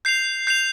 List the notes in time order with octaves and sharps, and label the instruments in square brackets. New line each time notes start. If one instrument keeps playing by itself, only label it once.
[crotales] G6 C7 F7
G6 C7 F7